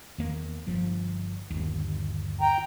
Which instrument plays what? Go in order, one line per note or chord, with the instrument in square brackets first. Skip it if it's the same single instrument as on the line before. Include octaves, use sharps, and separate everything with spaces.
[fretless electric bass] E2 D#3 A#3
G1 F3
G1 D#2
[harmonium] G5 A#5